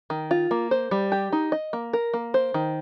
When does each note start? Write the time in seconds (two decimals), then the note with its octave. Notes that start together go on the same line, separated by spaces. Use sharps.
0.10 D#3
0.31 F4
0.51 A#3
0.71 C5
0.91 G3
1.12 G4
1.32 D#4
1.52 D#5
1.73 A#3
1.93 A#4
2.14 A#3
2.34 C5
2.54 D#3